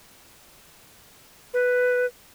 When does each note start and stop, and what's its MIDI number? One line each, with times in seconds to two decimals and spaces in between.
1.54 2.06 71